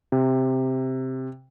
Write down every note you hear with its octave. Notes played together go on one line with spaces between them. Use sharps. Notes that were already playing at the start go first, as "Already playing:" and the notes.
C3